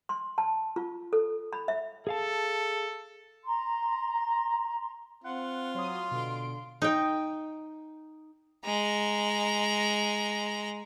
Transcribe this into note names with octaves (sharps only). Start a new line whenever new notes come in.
C6
A5
F4
A4
B5
E5
G#4 A4 F5 A5
A#5 C6
C4 F4 F#5
F#3 C6 D#6
B2 D3 D7
D#4 G5
G#3 A#5